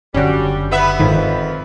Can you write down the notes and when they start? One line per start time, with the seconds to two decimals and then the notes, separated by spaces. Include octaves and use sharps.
0.14 F#1 D3 G3 C#4 F#4
0.72 B3 B4 E5
0.99 F2 G#2 D#3